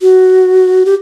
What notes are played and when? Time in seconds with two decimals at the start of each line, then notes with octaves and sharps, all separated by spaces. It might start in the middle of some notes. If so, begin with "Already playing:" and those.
0.01 F#4
0.86 G4